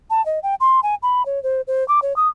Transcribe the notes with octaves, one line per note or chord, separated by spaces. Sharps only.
A5
D#5
G5
C6
G#5
B5
C#5
C5
C5
D6
C#5
D#6